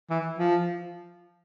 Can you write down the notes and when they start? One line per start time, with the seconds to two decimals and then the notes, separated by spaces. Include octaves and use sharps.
0.10 E3
0.38 F3